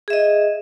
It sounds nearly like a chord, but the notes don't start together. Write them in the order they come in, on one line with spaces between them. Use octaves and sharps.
G#4 E5 D#5